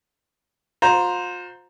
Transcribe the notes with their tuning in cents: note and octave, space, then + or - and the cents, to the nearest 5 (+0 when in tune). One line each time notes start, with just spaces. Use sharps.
F4 +40 C5 +0 A#5 +0